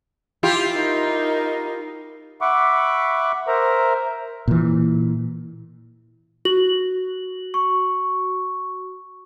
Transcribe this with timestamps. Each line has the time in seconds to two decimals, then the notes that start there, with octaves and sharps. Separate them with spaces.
0.43 E4 F4 G4
0.74 D#4 A#4
2.41 E5 F#5 B5 C#6 D6
3.48 A#4 C5 E5 A#5
4.48 A#2 E3
6.45 F#4 F#7
7.54 C#6